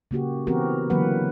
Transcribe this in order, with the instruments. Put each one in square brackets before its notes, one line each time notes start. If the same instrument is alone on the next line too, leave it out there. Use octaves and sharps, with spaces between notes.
[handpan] C#3 A#3 F#4 G4
E3 B3 C4 F#4 G4 A#4
D3 E3 F#3 A#3 B4 F#5